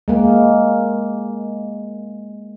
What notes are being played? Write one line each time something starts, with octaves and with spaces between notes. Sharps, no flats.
G#3 A#3